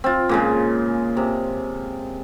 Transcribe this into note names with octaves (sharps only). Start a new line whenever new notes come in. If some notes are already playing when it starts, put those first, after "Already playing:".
C4 F4
A#2 C#3 G#3
C3